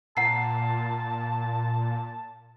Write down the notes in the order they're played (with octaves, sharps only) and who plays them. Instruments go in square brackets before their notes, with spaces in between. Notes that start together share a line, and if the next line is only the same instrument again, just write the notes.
[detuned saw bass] A#2 [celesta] F#5 A#5 C7 [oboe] A5